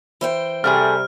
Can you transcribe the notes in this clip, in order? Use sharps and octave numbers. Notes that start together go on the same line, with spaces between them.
E3 C5 G5
C3 G3 A3 F4 G#4 F6